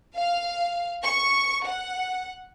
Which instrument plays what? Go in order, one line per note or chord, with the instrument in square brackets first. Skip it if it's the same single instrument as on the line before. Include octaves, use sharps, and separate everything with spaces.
[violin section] F5
C#6
F#5